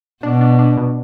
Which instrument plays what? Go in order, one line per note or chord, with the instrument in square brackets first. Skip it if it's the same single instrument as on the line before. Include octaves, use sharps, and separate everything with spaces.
[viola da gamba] B2 [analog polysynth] D4
[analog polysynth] D4
D4
B2